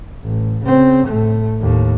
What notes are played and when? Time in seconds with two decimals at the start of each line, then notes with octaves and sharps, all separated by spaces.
0.23 A1
0.65 C#3 C4
1.07 A2 A3
1.61 D#2 A2